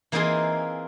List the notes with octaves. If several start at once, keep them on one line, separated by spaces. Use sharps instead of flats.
E3 A#3 C4 D#4 F4 G#4